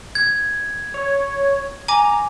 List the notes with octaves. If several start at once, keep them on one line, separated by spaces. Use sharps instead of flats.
G#6
C#5
G#5 A#5 D6